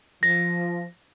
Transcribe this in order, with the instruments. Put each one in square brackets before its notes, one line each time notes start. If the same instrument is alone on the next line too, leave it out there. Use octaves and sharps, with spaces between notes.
[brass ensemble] F3 [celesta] A#6